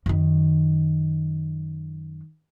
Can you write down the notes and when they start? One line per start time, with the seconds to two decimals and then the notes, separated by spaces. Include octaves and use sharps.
0.06 F#2 D#3